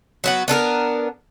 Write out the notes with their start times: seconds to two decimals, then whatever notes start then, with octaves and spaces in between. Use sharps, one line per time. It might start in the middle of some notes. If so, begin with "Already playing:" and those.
0.24 F#3 B3 F#4
0.48 B3 D4 A4 A#4